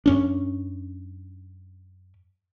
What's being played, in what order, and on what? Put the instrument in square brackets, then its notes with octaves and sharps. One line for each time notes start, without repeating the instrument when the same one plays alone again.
[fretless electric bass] F#2 C#4 D4